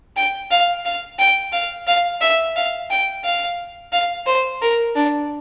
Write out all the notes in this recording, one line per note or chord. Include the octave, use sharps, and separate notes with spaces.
G5
F5
F5
G5
F5
F5
E5
F5
G5
F5
F5
C5
A#4
D4